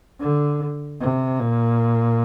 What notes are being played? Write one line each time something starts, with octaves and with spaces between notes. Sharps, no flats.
D3
C3
A#2